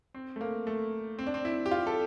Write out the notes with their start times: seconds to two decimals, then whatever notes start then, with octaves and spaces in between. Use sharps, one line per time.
0.15 C4
0.36 A3
0.41 A#3
0.67 A3
1.19 C4
1.27 D4
1.34 C4
1.45 E4
1.66 G4
1.71 F4
1.87 A4